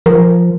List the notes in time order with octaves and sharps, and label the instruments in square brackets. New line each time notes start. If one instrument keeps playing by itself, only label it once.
[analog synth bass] F3 [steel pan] A#4